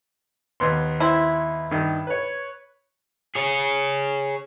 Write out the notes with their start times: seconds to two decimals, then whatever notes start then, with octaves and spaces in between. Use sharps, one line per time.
0.60 D#2 B3 C6
1.00 C4 E4
1.71 G2 D#3
2.07 B4 C#5
3.35 G#4 C#5